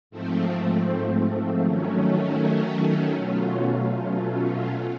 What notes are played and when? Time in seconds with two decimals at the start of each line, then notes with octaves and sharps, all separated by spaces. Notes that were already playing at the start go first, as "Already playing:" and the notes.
0.10 G#2 F3 A3 C4
1.63 D#3 F#3 A3 C#4
3.15 B2 F#3 A3 C#4 F4